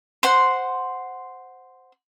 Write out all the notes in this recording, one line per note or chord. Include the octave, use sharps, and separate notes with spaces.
C5 F#5 C6